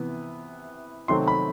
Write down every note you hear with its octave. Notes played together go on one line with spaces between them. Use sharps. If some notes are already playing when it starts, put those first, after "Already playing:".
Already playing: C3 E3 B3
C3 D#3 F#3 A3 C4 C6
B5